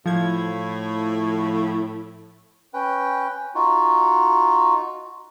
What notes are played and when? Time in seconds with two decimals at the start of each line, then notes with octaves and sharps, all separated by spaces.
0.06 A2 F3 G#6
2.74 C#4 B4 G5
3.55 D#4 F4 F#4